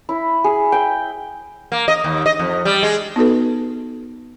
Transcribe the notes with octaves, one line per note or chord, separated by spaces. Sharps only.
E4
G#4
G5
A#3
D#5
D#2
D#5
F2
G3
G#3
B3 D#4 F#4 A4 B4